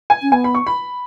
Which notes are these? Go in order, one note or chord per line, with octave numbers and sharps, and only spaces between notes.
G#5
C#4
B3 G#5
B5
C#6
B5